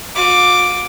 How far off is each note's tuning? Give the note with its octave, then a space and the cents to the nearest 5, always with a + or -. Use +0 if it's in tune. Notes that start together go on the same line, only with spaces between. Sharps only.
F4 +45 D6 +0